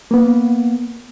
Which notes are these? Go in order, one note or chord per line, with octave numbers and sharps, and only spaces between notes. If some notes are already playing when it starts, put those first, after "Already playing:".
A#3 B3